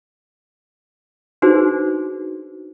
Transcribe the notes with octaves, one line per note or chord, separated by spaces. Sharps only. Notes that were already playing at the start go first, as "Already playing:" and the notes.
D4 D#4 F#4 G#4 B4 C5